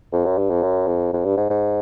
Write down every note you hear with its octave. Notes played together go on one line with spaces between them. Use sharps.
F2
F#2
G2
F2
F#2
F2
F2
G2
G#2
G#2